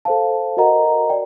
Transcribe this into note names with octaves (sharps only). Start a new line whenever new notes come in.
A4 C5 F5 A5
F#4 A#4 D#5 F#5 A#5
D5 G5